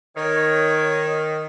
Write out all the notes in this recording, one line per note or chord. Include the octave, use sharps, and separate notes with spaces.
D#3 C#5